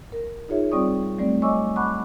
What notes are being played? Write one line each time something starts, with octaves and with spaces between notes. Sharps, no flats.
A#4
D#4 F4 G#4 C#5 E5
G3 C4 F4 D5 C#6 D#6
F#3 G3 A3 C4 D5
C#5 D#5 G#5 C#6 D6 E6
F#5 A5 B5 C#6 D6 F#6